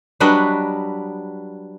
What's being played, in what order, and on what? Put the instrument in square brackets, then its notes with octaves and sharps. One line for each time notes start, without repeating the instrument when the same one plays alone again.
[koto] F#3 G3 D4 F#4 B4 D#5